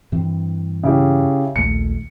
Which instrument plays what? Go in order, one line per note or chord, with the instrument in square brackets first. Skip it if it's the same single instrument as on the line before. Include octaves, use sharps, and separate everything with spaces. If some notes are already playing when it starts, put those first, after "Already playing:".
[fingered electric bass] G2 E3 C4
[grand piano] C#3 E4 G4
[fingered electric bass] A#1 D#2 A3 [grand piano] C#7